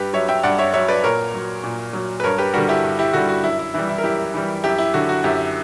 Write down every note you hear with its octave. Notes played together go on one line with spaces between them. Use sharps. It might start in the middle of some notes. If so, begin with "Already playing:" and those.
Already playing: G2 G4 B4
F#3 C#5 E5
E5 G5
G2 D5 F#5
C#5 E5
F#3 C#5 E5
B4 D5
A#2 A#4 C#5
F#3
A#2
F#3
B4
G2 A#4 C#5
G4 B4
D3 G3 F#4 A#4
E4 G4
G2
E4 G4
D3 G3 F#4
F#4
F#2 E4
E4
E3 G3 E4
E4
A#4
F#2 E4 G4
E3 G3
F#2 E4 G4
E4
D3 F#3 F#4
F#4
F#2 E4 G4